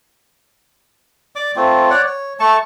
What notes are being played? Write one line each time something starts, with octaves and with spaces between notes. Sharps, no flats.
D5 D6
A3 C4 F4
C#5 D5 F#5
C#5
A3 A5 C#6